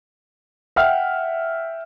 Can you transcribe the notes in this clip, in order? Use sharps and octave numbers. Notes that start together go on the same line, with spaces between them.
E5 F#5 G5 F6